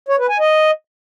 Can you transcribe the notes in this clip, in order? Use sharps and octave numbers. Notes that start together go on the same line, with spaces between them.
C#5
B4
G#5
D#5